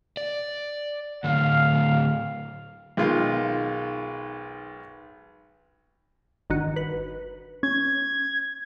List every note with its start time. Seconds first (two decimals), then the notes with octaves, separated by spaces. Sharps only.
0.17 D5
1.24 A2 D3 F5
2.97 B1 D#3 G#3 F4
6.50 G1 D#3 F#4
6.76 B4
7.63 C#4 G#6